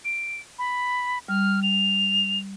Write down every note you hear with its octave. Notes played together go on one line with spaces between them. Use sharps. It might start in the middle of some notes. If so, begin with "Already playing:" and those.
D7
B5
G3 F6
F7